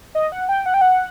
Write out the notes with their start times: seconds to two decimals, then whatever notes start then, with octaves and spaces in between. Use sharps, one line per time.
0.15 D#5
0.32 F#5
0.49 G5
0.66 F#5
0.74 G5
0.81 F#5